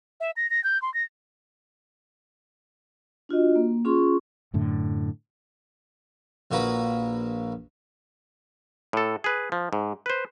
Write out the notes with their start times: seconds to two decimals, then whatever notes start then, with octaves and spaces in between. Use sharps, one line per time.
0.20 E5
0.37 A#6
0.50 A#6
0.64 G6
0.82 C6
0.94 A#6
3.29 D4 F4 F#4 D#5
3.56 A#3
3.85 C#4 F4 G#4 C6 C#6
4.54 F#2 A2 D3
6.51 A#1 A#3 F#4 B4 A#5 B5
8.93 A2 A4
9.24 G#4 B4
9.52 F3
9.73 G#2
10.06 B4 C5